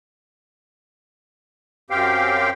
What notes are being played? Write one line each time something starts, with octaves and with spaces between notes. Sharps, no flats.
F#2 C4 G4 F5 G5